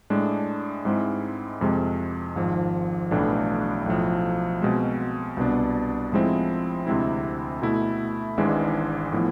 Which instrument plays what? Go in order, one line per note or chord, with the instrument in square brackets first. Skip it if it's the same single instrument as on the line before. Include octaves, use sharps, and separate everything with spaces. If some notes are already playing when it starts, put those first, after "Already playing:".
[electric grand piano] A2 G#3 D4
G#2 G#3 C4 E4
F2 C3 G#3
G#1 G#2 F3
B1 A2 E3 A3 D4
B1 A2 F3
B2 G#3 C4
C2 B2 B3 D4
A2 F3 G#3 C4 E4
D2 C3 G#3 C4 E4
B2 A3 E4
G#1 G#2 E3 G#3 D4
A2 F3 B3 E4